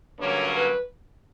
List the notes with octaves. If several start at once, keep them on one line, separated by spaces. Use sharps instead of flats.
G2 D3 F#3 A#3 C#4 C#5
B4